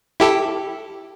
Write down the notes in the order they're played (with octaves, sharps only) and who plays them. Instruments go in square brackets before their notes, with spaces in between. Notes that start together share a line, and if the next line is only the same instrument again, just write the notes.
[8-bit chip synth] E4 G4 A4